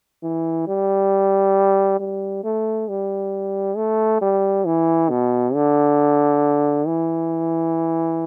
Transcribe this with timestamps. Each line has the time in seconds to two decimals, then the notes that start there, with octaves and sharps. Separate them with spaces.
0.23 E3
0.68 G3
2.00 G3
2.44 A3
2.88 G3
3.77 A3
4.22 G3
4.65 E3
5.10 B2
5.54 D3
6.87 E3